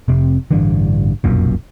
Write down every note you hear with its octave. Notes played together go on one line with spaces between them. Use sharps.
F1 C3 C4
A1 G2 D3 E3
F1 B1 F#2 A#2